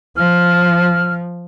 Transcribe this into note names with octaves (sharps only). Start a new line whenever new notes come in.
F3 F6